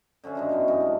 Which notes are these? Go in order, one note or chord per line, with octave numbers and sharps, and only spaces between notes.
D3 C#4 C5 E5
G2 D#3 F#4
F#2 B2 E4 F5
C3 E3 D#5
G#2 D4